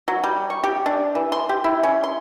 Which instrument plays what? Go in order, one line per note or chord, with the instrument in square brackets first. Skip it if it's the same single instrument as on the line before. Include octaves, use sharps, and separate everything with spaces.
[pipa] F#3
G3
C#6
G4
D4
E3
C6
G4
E4
C#4
C6